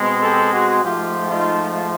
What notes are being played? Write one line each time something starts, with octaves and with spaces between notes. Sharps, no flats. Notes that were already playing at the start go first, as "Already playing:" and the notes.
Already playing: B2 G#3 C4
G4 A4
F#4 G#4
G#2 F3 A3 F4 G4
D#4 F4